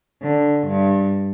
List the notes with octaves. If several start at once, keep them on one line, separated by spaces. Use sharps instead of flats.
D3
G2